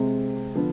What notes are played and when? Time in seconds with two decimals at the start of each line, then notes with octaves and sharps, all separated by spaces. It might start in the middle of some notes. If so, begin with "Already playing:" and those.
Already playing: C3 G#3 C4
0.55 D3 F3 B3